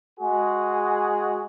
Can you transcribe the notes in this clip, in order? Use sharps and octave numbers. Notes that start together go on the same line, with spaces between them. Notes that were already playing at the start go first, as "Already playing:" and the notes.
G#3 F#4 G#4